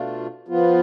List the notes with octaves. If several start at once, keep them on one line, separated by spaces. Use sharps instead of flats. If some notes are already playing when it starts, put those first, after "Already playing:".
Already playing: B2 A3 D4 F4
F3 B3 F4